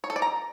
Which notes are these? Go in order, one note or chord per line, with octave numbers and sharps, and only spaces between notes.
C#5
A4
D5
A#5